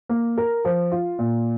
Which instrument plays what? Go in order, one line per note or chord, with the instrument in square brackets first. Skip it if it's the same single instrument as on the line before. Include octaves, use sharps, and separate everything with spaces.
[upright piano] A#3
A#4
F3
F4
A#2